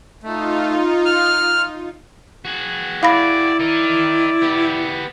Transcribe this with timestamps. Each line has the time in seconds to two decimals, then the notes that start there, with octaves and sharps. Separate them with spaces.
0.23 A3 D#4 F4
1.05 F6
2.45 F#4 G#4
3.03 E4 D5 F5 B5 A#6
3.59 D#4 A#4 D5
4.42 B3 G4